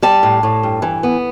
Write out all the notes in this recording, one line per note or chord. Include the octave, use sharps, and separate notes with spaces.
G3 A5
A2
A2
G2
E3
B3